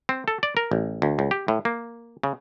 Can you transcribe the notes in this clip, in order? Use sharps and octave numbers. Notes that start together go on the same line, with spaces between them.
C4
A4
D5
A#4
A1
D2
C#2
G4
A2
A#3
C#3